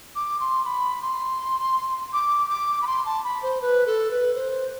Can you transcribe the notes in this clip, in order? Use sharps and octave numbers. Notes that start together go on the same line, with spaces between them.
D6
C6
B5
C6
D6
D6
B5
C6
A5
B5
C5
B4
A4
B4
C5